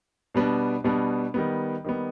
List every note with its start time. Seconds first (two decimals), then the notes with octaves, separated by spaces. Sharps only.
0.35 B2 G3 B3 D4
0.84 B2 G3 B3 D4
1.34 D#3 G3 B3
1.84 D#3 G3 B3